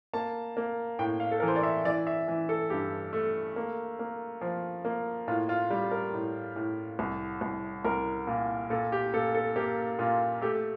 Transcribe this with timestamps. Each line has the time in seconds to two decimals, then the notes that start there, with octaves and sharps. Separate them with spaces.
0.13 A#3 A5
0.57 A#3
0.99 A2 G5
1.20 F5
1.31 A4
1.40 E3 A#4
1.48 C5
1.56 D5
1.63 E5
1.85 E3 D5
2.07 E5
2.28 E3
2.49 A4
2.70 G2 G4
3.13 A3
3.56 A#3
3.99 A#3
4.41 F3
4.85 A#3
5.28 A2 F4
5.49 F4
5.70 G3
5.91 A#4
6.14 A2
6.56 A2
6.99 C2
7.41 C2
7.85 C2 A#4
8.27 A#2
8.70 A#2 A4
8.92 G4
9.14 A#2 A4
9.35 A4
9.56 A#3 G4
9.99 A#2 F4
10.41 A3 G4